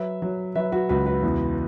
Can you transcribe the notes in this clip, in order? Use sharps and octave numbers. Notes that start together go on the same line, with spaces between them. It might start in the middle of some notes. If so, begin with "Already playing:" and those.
Already playing: F#3 B4 E5
F#3
F#3 B4 E5
F#4 B4
C#2 F#4 B4
F#4 B4
E2